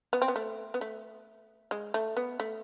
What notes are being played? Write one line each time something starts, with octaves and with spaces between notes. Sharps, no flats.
B3
C4
B3
A3
B3
A3
G#3
A3
B3
A3